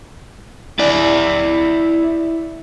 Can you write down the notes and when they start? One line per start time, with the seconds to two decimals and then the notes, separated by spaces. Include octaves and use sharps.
0.79 E4 D5